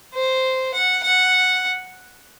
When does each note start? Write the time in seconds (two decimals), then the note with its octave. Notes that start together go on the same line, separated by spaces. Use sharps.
0.14 C5
0.74 F#5
1.03 F#5